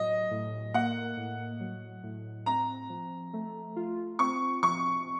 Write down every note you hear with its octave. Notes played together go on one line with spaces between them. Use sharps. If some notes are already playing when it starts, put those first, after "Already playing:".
Already playing: A2 F#3 D#5
A2
A#3 F#5
A2
F#3
A2
C4 A#5
F3
A3
F4
C4 C#6
F3 C#6